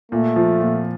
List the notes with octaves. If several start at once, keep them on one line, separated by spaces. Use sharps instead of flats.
A#2 A3
F3
A#2